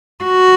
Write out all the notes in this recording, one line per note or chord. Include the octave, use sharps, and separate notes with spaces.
F#4